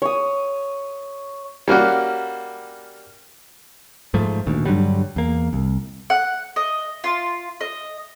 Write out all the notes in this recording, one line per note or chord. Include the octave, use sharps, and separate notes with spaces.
C#5 D#6
G3 A#3 C#4 F#4
G#2 F3 A3
D2 A#2 D#3
G2 D3 F#3 G3
E2 A#3
C2
F#5
D#5
F4
D#5